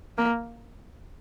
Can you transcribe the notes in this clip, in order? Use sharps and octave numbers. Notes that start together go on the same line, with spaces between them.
A#3